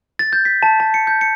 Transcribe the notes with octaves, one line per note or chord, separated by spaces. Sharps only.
A6
G6
B6
A5
A5
C#7
G6
C#7